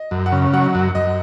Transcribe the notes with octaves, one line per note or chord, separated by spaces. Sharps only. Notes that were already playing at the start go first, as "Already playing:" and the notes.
Already playing: D#5
F#2
F#5
C#3
F#3 F#5
F#2
F#2 D#5